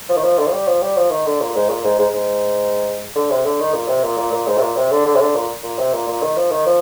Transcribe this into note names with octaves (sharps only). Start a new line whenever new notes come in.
F3
D#3
F3
D3
F3
G3
F3
G3
F3
D#3
D3
A#2
G#2
A#2
G#2
G#2
G#2
D3
C3
D3
D#3
A#2
C3
A#2
A#2
A#2
G#2
C3
A#2
C3
D3
D3
C3
D3
A#2
A#2
C3
A#2
A#2
D#3
F3
D#3
F3